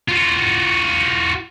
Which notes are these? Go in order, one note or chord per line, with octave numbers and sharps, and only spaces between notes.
F4 F#4